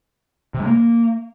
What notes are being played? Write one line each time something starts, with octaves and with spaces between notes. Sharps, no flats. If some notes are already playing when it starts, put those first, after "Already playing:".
C3
G#3
A#3